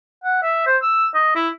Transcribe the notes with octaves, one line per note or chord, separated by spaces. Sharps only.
F#5
E5
C5
E6
D#5
E4